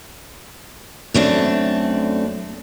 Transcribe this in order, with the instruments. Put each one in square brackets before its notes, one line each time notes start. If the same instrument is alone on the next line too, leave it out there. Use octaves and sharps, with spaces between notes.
[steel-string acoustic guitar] F#2 A3 C4 D4